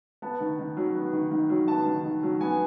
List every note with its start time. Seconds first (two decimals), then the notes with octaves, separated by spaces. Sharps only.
0.22 B3 A5
0.40 D#3
0.59 D#3
0.77 F#3
0.95 B3
1.13 D#3
1.31 D#3
1.50 F#3
1.68 B3 A5
1.86 D#3
2.04 D#3
2.23 F#3
2.41 B3 G#5